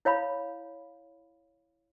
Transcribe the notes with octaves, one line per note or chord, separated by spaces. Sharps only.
E4 C#5 F5 B5